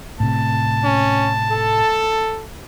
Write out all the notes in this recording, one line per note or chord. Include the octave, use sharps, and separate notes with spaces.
A2 C3 A5
C#4
A4